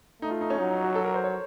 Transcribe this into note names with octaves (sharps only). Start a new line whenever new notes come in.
A3 D#4
F4
D#4
C#4
F#3 D#4
D#4
F#4
A4
A#4
C5
C#5